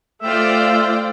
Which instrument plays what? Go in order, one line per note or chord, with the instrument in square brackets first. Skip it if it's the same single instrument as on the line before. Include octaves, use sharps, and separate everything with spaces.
[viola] A3 F4 [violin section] C5 D5 G5 [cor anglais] E5